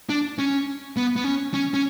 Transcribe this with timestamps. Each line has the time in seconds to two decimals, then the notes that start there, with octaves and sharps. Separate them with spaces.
0.09 D4
0.39 C#4
0.97 B3
1.16 B3
1.24 C#4
1.54 C#4
1.74 C#4